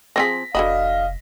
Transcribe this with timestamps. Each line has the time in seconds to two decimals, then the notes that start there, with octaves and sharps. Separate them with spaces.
0.16 F3 C4 G#4 A#6 B6
0.55 F1 D3 F#4 D#5 F5 B5